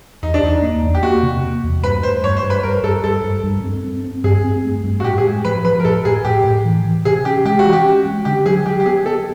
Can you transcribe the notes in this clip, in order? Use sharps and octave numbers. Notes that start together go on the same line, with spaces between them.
E2 D#4
D4
E2 D#4
A#3
E2
G4
A#3 F#4
C3
A#3
E2
G2 B4
A3 C5
G2 C#5
C5
G2
B4
G2 A#4
G2 A4
G2 A4
G2
G2
C4
C4
C4
G2 G#4
C4
A3
G2
F#4
A2 G4
G#4
G#3
F3 B4
F3 B4
A#4
A2 A4
A2 G#4
A2 G4
A2
E3
E3
C3 G#4
C#4 G4
G#3 G4
F#4
E3
G4
C#4
G#3
D3 G4
F#3 G#4
F#3 G4
G4
B3 G#4
B3 A4